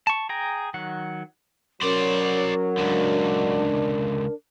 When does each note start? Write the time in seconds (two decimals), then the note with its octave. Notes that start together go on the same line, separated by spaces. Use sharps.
0.07 A5 C#6
0.29 G#4 G5 A#5
0.74 D#3 F#3 F#5
1.82 F#3 C#4 A#4 C5 D5
2.78 C#2 D3 D4